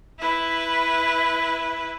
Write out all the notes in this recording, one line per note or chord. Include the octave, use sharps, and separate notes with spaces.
E4 B4